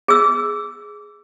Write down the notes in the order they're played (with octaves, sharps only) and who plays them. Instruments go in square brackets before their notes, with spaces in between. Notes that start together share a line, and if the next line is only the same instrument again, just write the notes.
[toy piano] G#4 E6